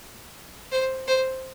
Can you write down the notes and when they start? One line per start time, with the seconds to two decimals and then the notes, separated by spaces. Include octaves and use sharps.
0.71 C5
1.07 C5